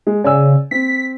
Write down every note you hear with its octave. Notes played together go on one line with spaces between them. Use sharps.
G#3
C#3 D5 G#5 E6
C4 B6